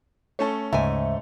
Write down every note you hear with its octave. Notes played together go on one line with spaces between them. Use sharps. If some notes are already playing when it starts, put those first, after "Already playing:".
A3 C#4 A4 C#5
D2 G#2 C#3 E5 G#5